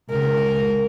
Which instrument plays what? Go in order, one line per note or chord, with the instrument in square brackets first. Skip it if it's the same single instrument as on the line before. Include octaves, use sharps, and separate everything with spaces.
[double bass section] C#2 [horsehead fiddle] A#4